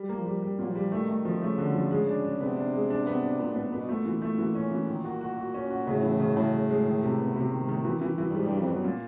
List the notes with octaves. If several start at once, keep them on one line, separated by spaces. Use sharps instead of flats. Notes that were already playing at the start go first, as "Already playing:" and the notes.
Already playing: G3
A#3
F3
G3
G3
A#2 F#3
F3
G3
D#3 A3
A3
F3
C#3 A3
D3
F3
G#3
D4
D4
C3 B3
D4
G#3
D4
B3
D4
A#2 B3
A2 B3
A#2
B2 B3
A#2 A3
E3
A3
E3
C#4
E3
D#3
F#4
F#4
F#4
C#4
F#4
A2 C#3
E3
C#3
A2 C#3
C#3
G#3
D#3
C3
B3
A2 C3
A#2 D#3
G#2
A2 D#3
E3
E3
E3
G2
G#2 G3
G2 G3
F2
F#2 B3
A#2